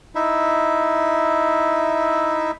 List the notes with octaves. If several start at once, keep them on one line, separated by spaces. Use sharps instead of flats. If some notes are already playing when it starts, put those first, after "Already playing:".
D#4 E4 E5